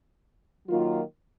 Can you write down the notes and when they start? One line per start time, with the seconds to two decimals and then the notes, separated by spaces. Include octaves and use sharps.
0.68 D#3 F#3 A#3 F4